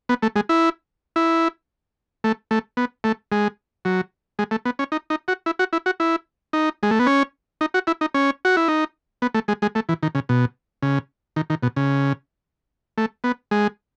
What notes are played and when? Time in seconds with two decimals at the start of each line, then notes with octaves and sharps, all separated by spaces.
0.09 B3
0.22 A3
0.36 G#3
0.49 E4
1.16 E4
2.24 A3
2.51 A3
2.77 B3
3.04 A3
3.32 G#3
3.85 F#3
4.39 G#3
4.51 A3
4.65 B3
4.79 C#4
4.92 D#4
5.10 D#4
5.28 F#4
5.46 E4
5.59 F#4
5.73 E4
5.86 F#4
6.00 E4
6.53 D#4
6.83 G#3
6.91 A3
6.99 B3
7.07 C#4
7.61 D#4
7.74 F#4
7.87 E4
8.01 D#4
8.14 C#4
8.45 F#4
8.57 E4
8.68 D#4
9.22 B3
9.34 A3
9.48 G#3
9.62 G#3
9.75 A3
9.89 E3
10.03 D#3
10.15 C#3
10.29 B2
10.82 C#3
11.36 D#3
11.50 D#3
11.63 B2
11.76 C#3
12.98 A3
13.24 B3
13.51 G#3